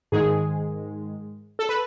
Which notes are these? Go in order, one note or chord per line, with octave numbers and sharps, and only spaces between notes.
G#2 D#3 G#3 G#4
A4
B4